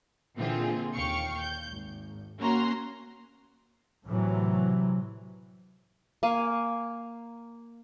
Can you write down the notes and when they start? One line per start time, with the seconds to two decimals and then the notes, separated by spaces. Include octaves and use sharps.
0.37 A#2 D3 E3 C4 F4 G#4
0.95 D#2 F5 G5 C#6 C#7
1.39 G6
1.69 G#1
2.39 A#3 C#4 F#4 A#5 C6
4.06 A2 C3 E3 F#3
6.23 A#3 F5 G#5